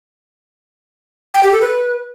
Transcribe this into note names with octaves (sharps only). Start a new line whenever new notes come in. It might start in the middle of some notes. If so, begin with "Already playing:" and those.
G5
G4
A4
B4